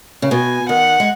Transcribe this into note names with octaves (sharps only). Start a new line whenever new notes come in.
C#3
B2 G#5
D#3 F#5
G#3